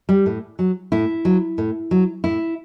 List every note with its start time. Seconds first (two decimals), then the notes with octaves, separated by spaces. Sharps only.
0.09 G3
0.26 A2
0.59 F#3
0.92 A2 E4
1.25 F#3
1.58 A2
1.91 F#3
2.24 A2 E4